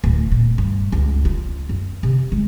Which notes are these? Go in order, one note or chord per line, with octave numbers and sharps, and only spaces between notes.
D1
A#2
G2
C#2
F4
F#2
C3
G#3